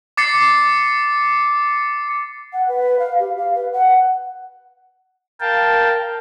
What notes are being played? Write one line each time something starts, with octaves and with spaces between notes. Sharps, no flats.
D6 A6 C7 C#7
F#5
B4
F5
G4
F5
B4
F#5
A#4 F5 G5 A5